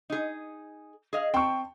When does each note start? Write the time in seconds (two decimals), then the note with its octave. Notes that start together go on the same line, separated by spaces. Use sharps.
0.10 D#4 G#4
1.13 G#4 D#5 F5
1.34 C4 G5 A5 C#6